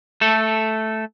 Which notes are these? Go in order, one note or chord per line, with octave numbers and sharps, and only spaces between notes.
A3 A4